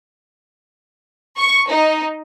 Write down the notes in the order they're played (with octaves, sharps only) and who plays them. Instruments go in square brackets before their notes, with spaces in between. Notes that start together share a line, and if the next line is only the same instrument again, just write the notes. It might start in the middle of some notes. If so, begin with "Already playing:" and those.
[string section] C#6
D#4